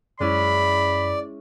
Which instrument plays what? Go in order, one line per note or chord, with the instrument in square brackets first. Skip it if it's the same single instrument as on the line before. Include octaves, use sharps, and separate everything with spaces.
[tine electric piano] F#2 [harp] G#3 C#4 E4 [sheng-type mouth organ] D5 [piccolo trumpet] B5